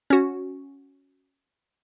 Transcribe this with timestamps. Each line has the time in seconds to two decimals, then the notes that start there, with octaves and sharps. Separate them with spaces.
0.10 C#4 F#4